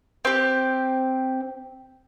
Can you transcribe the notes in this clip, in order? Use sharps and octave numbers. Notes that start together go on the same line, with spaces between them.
C4 G4